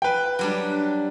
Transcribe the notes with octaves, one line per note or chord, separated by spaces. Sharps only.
B4 G5
F#3 G3 D4